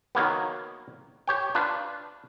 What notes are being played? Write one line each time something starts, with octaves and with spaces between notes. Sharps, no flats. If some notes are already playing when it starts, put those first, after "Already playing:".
D#3 F#3 A#3 B3
G4 C#5 G5
D4 F4 B4